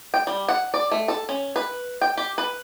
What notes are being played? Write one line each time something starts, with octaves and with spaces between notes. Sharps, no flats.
G5
G3
F#5
D5
A3
A4
C#4
B4
G5
G4
B4